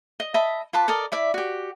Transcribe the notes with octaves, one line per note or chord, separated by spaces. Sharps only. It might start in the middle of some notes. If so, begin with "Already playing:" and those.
D#5
D#5 E5 A5 B5
F4 B4 A5 D6
A4 A#4 D5 D#5
E4 D5 E5
F#4 G4